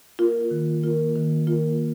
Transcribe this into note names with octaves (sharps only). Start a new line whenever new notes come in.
A#3 F4 A#4
D#3
A#3 F4 A#4
D#3
A#3 F4 A#4